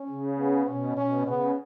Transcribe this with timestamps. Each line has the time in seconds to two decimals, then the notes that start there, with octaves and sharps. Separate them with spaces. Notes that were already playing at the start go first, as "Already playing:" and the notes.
Already playing: C#4
0.09 C#3
0.38 B3
0.68 B2 C#4
0.97 B2 C#4
1.26 C#3 B3